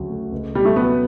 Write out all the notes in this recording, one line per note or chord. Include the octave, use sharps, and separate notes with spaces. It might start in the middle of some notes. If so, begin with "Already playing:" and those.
Already playing: D2 C#3 F#3
A3
C#2
B2 G3
A3
F#3 B3